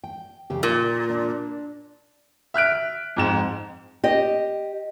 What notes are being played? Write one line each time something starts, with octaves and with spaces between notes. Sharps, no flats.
G5
F2 C#3 G4
A#2 A#3
D4
E5 F6 F#6 D7
F2 G#2 E7
G4 D#5